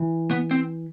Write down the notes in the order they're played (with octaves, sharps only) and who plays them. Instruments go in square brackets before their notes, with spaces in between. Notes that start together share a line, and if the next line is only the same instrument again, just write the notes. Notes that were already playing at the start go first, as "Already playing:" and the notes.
Already playing: [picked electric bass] E3
[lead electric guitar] B3
C4